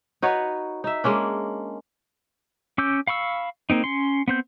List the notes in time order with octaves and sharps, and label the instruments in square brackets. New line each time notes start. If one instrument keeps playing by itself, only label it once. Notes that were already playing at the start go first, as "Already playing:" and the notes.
[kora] D#4 F#4 B4 C#5
D#4 E5
G#3 A#3 C#4 D4
[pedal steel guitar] C#4 D6 E6 G6
F5 B5 C#6 E6
A#3 C4 D#4
C#4 C6
B3 C4 G6